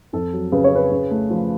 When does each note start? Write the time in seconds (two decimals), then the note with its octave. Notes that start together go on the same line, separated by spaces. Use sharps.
0.13 F2 A4
0.33 F#3
0.52 C#3 B4
0.64 C#5
0.71 C#4 B4
0.91 C#3
1.11 A3
1.30 F3